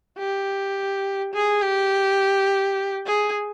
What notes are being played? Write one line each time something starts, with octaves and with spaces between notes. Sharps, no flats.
G4
G#4
G4
G#4